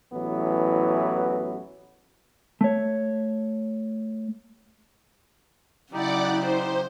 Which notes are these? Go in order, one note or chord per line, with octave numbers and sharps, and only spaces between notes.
A1 E3 F#3 B3
A3 C#5
C#3 F#3 D#4 E4 G4 D5 F#5 D6
C5